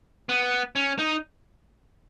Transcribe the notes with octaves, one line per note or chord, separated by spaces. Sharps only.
B3
C#4
D#4